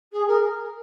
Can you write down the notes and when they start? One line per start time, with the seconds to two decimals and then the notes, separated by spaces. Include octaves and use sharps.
0.12 G#4
0.27 A#4